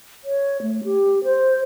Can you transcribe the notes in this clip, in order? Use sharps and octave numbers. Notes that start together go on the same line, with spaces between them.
C#5
A3
G4
C5